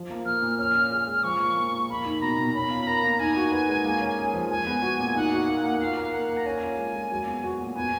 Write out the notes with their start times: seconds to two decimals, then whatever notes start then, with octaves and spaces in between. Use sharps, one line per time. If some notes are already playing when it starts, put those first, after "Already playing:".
Already playing: F3
0.10 A#3
0.25 A#2 F6
0.42 A#2
0.59 C#4 F6
0.75 F4
0.91 G#4 F6
1.07 G#3
1.23 F3 C#6
1.40 A#3
1.56 A#2
1.73 A#2
1.89 A#3 B5
2.05 D#4
2.21 B2 A#5
2.38 B2
2.54 C#4 B5
2.70 F4
2.87 A#4 A#5
3.03 A#3
3.19 D#4 G#5
3.36 F#4
3.52 B4
3.69 G#3
3.85 A#3
4.01 C#4
4.18 G#4
4.33 F3
4.49 G#3 G#5
4.67 B3
4.82 F#4
4.99 A#2
5.15 D#4 F#5
5.32 F#4
5.48 A#3
5.64 A#3
5.80 F4 F5
5.97 A#4
6.13 A#3 F#5
6.29 A#3
6.37 A#5
6.46 C#4 G#5
6.62 F4
6.78 G#3
6.95 G#3
7.11 F#3
7.27 B3
7.44 F#4
7.60 A#2
7.75 B3 G#5